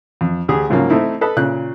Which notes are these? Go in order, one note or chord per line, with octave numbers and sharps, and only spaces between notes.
F2
D2 G4 G#4
G#2 C#3 F3 F#3 A#3
A3 C4 D#4 E4
A4 B4 D#5
A#2 C#3 F#6